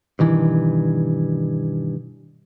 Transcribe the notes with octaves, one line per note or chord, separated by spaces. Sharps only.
G2 B2 D#3 E3